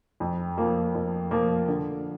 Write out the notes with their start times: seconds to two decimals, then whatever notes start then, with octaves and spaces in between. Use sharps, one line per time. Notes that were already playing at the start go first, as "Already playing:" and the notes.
0.20 F2
0.57 F3 A#3 F4
0.95 F2
1.31 F3 A#3 F4
1.68 D3